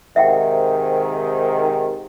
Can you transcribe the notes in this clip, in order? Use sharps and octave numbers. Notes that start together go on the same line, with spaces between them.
G#2 C3 D#3 E5 F#5 G5